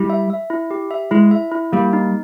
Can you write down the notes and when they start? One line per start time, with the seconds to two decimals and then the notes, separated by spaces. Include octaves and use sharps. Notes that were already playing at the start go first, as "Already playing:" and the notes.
Already playing: G3 E4
0.10 E5
0.30 E5
0.50 E4
0.71 G4
0.91 E5
1.11 G#3 E4
1.31 E5
1.52 E4
1.72 G3 A#3
1.93 D#4